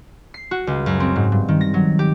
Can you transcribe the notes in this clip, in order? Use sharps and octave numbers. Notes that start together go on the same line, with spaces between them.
C7
F#4
C#2
F#2
C4
G#2
G2
D#3
A#6
F#3
G4